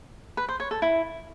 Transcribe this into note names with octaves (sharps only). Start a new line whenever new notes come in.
B4
C5
C#5
A4
E4